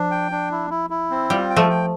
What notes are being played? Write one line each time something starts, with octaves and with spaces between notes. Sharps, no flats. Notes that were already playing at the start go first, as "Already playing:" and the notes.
Already playing: F3 D4
G5
D4
E4
E4
E4
C4
G3 F4
G5
F3 A3
G5